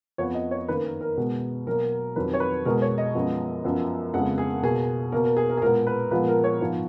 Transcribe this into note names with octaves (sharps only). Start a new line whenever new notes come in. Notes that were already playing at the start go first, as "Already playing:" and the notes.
F2 F3 B3 C#5
D#5
C#5
F#2 D#3 A#3 B4
A#4
A#4
B2 G#3 B3
B2 F#3 A#3 A#4
F2 D#3 F#3 B4
C#5
B4
B2 G#3 B3 A#4
C#5
D#5
F#2 F3 G#3 B3
F#2 F3 B3
F2 C#3 G#3 B3 F#5
G#4
B2 A#3 G#4
B2 A#3 A#4
A#4
G#4
A#4
G#4
A#2 G#3 B3 A#4
B4
A#2 F3 G#3 B3 B4
A#4
C#5
G#2 F3 B3